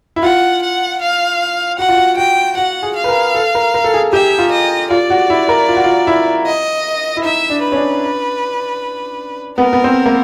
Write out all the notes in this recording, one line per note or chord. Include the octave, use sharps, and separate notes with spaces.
E4
F4 F#5
F#5
F5
F#4 F#5
F4
F#4
F#4 G5
F#4 F#5
G#4
F5
B4
A#4
A4
A#4
A#4
A4
G#4
G4 E5
F4
D#5
F4 D5
F#4
E4
A#4
F4
F#4
F4
E4
D#5
E4
D#4 E5
D4
B4
C#4
D4
B3 A#4
B3
C4
A#3